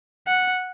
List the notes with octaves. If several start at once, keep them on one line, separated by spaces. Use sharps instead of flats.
F#5